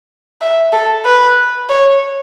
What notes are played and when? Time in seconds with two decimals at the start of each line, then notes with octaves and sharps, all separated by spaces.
0.41 E5
0.73 A4
1.05 B4
1.69 C#5